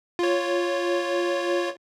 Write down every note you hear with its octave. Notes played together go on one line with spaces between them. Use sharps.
F4 C#5